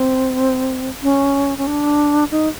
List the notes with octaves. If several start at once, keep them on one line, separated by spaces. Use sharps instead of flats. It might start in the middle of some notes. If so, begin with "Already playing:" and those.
Already playing: C4
C#4
C#4
D4
D#4